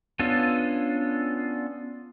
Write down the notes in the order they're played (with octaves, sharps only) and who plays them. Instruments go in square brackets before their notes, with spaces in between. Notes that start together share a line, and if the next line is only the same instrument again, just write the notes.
[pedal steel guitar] B3 C#4 D4 F4 A4